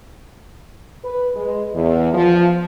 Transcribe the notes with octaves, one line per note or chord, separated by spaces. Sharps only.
B4
G#3
E2
F3